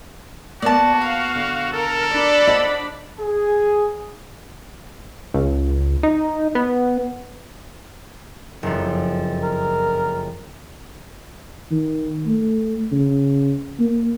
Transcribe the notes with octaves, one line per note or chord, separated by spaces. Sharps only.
A#3 B3 F#4 D5 A5
F5 B5
D3
A4 A#4
D4 D5 B5
C5 D#5 F#5
G#4
C#2
D#4
B3
F#1 F2
A#4
D#3
A3
C#3
A#3